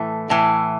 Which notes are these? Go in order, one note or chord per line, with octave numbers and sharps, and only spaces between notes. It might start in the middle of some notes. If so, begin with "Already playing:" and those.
Already playing: A2 E3 A3
A2 E3